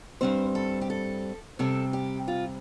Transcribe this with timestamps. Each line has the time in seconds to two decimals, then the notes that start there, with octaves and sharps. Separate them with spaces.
0.21 G2 G3 C4 C5
0.55 A4
0.81 G4
0.90 A4
1.59 C3 G3 C4 A4
1.93 G4
2.28 F4